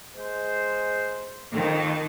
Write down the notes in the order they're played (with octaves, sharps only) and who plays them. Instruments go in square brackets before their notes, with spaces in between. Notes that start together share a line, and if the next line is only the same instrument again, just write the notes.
[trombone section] G#3 C5
[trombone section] F2 [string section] D#3